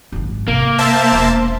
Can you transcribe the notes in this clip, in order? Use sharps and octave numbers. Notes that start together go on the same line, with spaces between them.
G#1 F#2
C3 A#3
C5 E5 A5
E1 B3